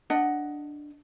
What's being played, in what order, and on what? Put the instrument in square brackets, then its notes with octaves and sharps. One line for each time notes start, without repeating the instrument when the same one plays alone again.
[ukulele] D4 D#5 F#5